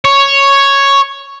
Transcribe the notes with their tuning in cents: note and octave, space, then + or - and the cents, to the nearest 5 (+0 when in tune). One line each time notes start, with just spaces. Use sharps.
C#5 +0